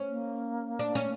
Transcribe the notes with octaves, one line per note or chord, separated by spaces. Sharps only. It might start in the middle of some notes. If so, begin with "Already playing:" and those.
Already playing: C#4
A#3
D4
C#4